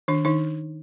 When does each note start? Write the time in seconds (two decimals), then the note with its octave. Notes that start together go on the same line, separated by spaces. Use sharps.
0.08 D#3 D4
0.25 D#3 D#4